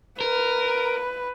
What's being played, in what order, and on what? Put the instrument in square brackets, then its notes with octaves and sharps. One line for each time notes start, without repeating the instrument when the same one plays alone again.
[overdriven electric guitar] A#4 [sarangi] B4